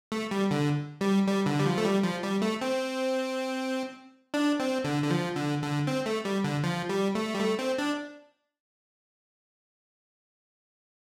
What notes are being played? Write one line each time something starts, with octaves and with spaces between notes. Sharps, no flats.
A3
G3
D3
G3
G3
D3
G3
F3
A3
G3
F3
G3
A3
C4
D4
C4
D3
D3
F3
D3
D3
C4
A3
G3
D3
F3
G3
A3
G3
A3
C4
D4